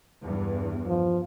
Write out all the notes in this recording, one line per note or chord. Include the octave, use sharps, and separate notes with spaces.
E2 G2
F3